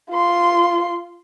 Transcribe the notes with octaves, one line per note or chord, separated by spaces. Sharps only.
F4 C6